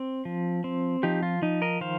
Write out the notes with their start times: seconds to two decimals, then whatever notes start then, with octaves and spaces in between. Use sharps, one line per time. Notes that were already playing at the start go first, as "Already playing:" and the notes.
Already playing: C4
0.25 F3
0.64 C4
1.03 F3 D#4 G4
1.23 F4
1.42 F3 D#4
1.62 A#4 D#5
1.81 D#3 C5 F5